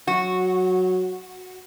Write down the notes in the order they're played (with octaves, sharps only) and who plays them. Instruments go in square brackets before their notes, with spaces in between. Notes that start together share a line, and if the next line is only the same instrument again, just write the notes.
[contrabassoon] F#3 [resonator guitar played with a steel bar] F#4